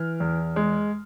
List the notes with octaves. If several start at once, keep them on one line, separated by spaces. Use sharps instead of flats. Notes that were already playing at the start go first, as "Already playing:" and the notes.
Already playing: E3 F6
E2
G#3